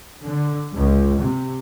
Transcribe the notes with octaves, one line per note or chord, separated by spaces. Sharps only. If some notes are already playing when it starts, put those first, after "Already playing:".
D3
C#2
C3